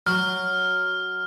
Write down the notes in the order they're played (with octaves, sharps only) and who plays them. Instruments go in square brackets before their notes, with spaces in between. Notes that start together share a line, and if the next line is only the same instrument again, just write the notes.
[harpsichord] F#3 [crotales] F6